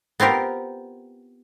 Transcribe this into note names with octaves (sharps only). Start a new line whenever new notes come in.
B3 C4 F4 G4 A#4